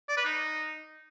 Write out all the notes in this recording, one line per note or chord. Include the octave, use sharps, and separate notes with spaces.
D5
B4
D#4